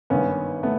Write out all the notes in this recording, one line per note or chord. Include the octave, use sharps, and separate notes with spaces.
G#1 G2 D#3 B3 C#4
A3 B3